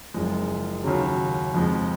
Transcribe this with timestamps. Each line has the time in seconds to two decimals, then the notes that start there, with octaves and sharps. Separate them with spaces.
0.14 F#1 F#2 F3 G#3
0.84 D#2 C#3 F#3
1.54 F2 F3 G#3